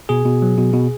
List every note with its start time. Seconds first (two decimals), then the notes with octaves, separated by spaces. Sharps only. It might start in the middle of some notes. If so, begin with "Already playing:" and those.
0.09 B2 G#4
0.25 B2
0.42 F#3
0.58 B2
0.74 B2